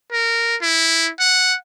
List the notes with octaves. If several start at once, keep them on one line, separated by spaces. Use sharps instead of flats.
A#4
E4
F#5